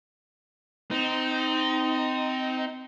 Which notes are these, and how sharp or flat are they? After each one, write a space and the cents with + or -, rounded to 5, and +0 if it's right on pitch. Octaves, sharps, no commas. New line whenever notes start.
C4 -20 D#4 +5